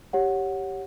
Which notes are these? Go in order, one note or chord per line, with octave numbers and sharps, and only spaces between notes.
G4 C#5 F#5